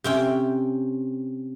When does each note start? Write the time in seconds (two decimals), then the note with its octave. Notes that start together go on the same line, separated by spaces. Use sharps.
0.04 C3 C#4 G5